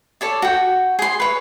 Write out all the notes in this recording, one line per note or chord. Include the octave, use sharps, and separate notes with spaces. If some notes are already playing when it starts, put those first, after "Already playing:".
A4 C#5 D5
F#4 G5
G#4 C6
B4 C#5